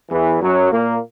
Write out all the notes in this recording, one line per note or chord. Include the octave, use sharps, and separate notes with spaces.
E2 E3
F#2 F#3
A#2 A#3